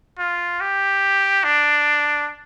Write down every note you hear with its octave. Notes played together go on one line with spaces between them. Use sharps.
F4
G4
D4